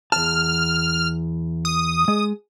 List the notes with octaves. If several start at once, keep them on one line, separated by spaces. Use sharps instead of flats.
E2 A5 F6
D#6
G#3